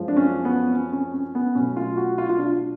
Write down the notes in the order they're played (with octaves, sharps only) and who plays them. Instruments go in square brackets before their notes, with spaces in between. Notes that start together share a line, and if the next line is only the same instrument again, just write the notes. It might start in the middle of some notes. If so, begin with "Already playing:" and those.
Already playing: [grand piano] F#2 F3 G#3
D4
C#4
B3
C#4
C#4
C#4
B3
B2 F#3 A3 C#4
F4
F#4
F4
F4
D4